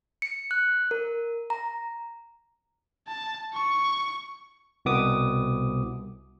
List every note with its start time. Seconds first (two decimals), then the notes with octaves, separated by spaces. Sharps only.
0.22 C#7
0.51 F#6
0.91 A#4
1.50 A#5
3.07 A5
3.54 C#6
4.85 C2 B2 B3 D6 D#6